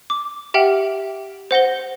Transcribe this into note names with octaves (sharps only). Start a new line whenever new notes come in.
D6
G4 E5 F#5 G5 F6 F#7
C5 F#5 A#6 G7